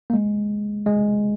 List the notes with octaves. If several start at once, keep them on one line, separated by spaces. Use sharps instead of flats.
A#3
G#3
G#3